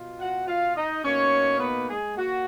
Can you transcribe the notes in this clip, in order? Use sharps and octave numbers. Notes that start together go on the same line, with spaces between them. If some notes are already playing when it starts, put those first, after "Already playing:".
Already playing: B2 F4
F#4 F#5
F4 F5
D#4 D#5
B2 A#3 C#4 D#4 C#5
B3 B4
G#3 G#4
A#3 F#4